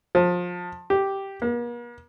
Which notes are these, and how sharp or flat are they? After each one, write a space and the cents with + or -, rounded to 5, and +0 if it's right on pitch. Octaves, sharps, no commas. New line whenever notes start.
F3 +25
G4 -5
A#3 +45